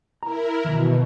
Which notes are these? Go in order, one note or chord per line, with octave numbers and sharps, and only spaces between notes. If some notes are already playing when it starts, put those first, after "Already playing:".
E4 A#4 A#5
B2 D#3 E3